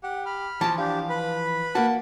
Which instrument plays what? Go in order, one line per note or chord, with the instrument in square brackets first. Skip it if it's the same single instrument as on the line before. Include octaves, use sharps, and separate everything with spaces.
[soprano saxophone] G4 [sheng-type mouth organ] F#5
[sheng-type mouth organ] B5 F6
[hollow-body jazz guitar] E3 F3 [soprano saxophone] A5
[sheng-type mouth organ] D4 G4 [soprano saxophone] F5
[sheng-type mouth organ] B4 B5
[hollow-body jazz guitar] A#3 F#4 [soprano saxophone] A5